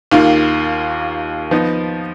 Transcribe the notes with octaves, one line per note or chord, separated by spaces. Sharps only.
D#2 D#3 A#3 F4
F3 B3 D#4